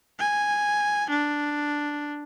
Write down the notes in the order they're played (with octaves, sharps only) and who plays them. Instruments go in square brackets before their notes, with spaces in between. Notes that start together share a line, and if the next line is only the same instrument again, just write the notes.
[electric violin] G#5
D4